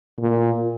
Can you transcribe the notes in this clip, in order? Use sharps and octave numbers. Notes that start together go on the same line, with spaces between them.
A#2